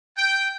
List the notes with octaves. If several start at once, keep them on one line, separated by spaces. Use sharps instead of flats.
G5